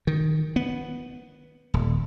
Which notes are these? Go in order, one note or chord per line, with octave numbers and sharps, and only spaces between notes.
D#3
B3
D#1